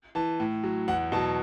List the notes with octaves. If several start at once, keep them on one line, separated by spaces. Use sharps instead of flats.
E3 A5
A2
F#3
E2 F#5
B2 F#3 A5